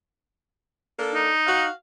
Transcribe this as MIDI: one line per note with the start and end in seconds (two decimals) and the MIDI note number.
0.99 1.30 58
0.99 1.30 62
0.99 1.30 69
1.14 1.65 63
1.47 1.71 66
1.47 1.71 77